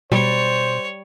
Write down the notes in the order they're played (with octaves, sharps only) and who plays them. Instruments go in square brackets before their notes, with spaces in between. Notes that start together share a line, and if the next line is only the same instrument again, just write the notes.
[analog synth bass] B2 [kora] G3 [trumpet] C5 [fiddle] C#5